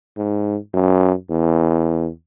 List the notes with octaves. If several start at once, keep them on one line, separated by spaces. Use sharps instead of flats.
G#2
F#2
E2